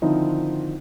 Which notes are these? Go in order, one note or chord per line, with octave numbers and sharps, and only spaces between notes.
D3 D#3 F3 C4 D#4 E4